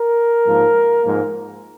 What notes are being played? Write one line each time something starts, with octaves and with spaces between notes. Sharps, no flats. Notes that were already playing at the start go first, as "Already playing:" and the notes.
Already playing: A#4
G#2 F3 A#3
G#2 F3 A#3